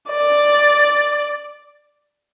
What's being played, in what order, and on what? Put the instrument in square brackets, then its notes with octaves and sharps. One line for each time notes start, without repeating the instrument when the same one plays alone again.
[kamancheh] D5